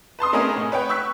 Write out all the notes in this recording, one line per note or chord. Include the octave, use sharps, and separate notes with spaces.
B4 A5 C6 D#6
A3 B3 C#4 D#4 G#4 A#4
A2
B4 C#5 F#5 G5
C#6 E6 F#6 B6